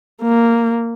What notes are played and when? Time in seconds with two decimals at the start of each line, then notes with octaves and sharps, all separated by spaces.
0.22 A#3